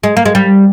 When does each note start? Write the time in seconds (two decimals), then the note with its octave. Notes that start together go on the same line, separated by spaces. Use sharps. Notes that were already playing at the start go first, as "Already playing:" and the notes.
0.03 G#3
0.17 A#3
0.26 G#3
0.35 G3